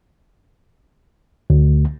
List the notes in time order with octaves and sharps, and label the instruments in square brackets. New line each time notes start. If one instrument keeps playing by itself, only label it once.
[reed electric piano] D2